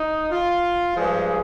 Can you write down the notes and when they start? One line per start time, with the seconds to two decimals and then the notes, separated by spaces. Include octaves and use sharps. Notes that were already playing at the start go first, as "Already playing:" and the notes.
Already playing: D#4
0.31 F4
0.96 G2 F3 G#3 G#4